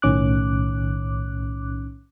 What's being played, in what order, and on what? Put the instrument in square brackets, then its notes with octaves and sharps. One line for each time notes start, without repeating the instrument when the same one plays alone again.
[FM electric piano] B1 A2 D#3 C#4 D6 F#6